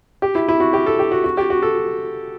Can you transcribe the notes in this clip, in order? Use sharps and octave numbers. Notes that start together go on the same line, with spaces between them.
G4
E4
E4
F#4
G4
A4
G4
F#4
F#4
G4
F#4
A4